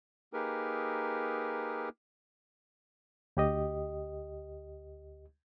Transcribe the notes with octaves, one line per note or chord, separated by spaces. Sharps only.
A#3 D#4 G4 G#4 A#4 B4
D2 G4 D#5